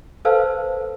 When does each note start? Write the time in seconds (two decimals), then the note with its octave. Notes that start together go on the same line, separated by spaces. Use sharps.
0.25 A4 B4 C5 F5 A5 E6